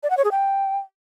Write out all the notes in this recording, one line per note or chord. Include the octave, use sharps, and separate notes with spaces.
D5
F#5
C#5
G#4
G5